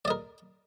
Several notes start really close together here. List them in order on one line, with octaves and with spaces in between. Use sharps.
D5 D#5 A#4